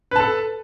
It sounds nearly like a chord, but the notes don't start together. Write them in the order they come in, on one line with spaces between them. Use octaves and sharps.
B4 A5 A4